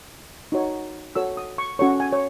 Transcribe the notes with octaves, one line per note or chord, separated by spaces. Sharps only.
D#4 F#4 C#5
F#4 A4 C#5 E6
D#6
C#6
C#4 F#4 A4 C#5 C#6
G#5
C#5